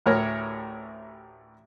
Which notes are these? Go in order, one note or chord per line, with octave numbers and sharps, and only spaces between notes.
A1 D2 A2 A#4 C#5